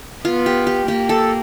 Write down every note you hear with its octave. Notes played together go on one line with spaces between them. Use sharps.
B3 F4
G4
G4
A#3 G4
A4